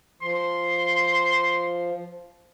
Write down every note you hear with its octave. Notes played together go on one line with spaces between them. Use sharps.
F3 C6